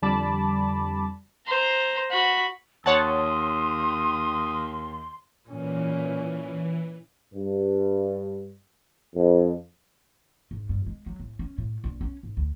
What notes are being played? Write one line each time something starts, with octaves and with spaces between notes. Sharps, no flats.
F2 D3 G3 A5 B5 D6
C5 A#5
F#4 B5
D#2 C#5 F#5 A5 C6 D#6
A#2 E3 C#4
G2
F2
G#2
G2
G#3
F#3
A2
C#4
A2
A#1
C#4
G#2
D2